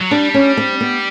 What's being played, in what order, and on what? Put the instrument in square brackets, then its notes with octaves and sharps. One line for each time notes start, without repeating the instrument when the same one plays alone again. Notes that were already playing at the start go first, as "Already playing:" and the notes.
[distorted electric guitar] F#3
[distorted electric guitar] G3 [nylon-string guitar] D4
[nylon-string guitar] C#4
C4
B3